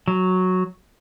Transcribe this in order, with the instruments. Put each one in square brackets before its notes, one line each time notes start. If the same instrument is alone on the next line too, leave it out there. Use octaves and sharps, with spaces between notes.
[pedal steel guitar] F#3